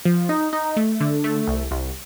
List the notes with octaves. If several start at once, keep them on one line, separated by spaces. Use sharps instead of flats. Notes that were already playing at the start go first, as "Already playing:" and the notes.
F3
D#4
D#4
A3
D3
A3
C2
C2